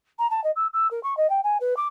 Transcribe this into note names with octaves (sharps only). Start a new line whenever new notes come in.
A#5
A5
D#5
E6
E6
A#4
C#6
D#5
G5
G#5
B4
D6